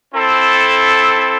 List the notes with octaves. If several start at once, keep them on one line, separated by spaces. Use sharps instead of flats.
C4 E4 A4